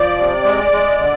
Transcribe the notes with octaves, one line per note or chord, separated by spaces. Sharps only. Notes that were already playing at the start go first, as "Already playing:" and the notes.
Already playing: F3 D5
C3
G#3
G#3
D3